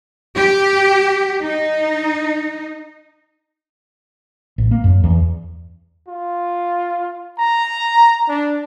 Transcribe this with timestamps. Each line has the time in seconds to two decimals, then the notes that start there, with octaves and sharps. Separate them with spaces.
0.35 G4
1.41 D#4
4.58 A1
4.71 A#3
4.84 F#2
5.04 E2
6.08 F4
7.39 A#5
8.28 D4